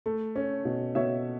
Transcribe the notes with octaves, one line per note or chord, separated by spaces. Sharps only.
A3
C#4
B2
B2 C#5 E5